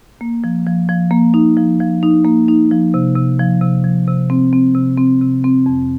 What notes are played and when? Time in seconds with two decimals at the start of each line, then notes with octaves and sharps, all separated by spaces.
0.21 A#3
0.44 F3
0.66 F3
0.89 F3
1.11 A#3
1.34 D#4
1.57 F3
1.80 F3
2.03 D#4
2.25 A#3
2.48 D#4
2.71 F3
2.94 C3
3.16 C3
3.39 F3
3.61 C3
3.84 F3
4.07 C3
4.30 C4
4.53 C4
4.75 C3
4.98 C4
5.22 C3
5.44 C4
5.66 F2